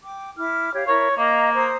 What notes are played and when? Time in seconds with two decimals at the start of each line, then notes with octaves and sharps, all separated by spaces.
0.03 G5 D6
0.37 E4 D6 F6
0.74 G4 C#5 F5
0.87 E4 A#4 C#5
1.17 A#3 D#5 F5 A#5
1.53 C5 A#5 D#6